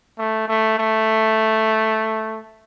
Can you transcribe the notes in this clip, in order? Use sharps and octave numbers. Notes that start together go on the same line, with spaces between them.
A3
A3
A3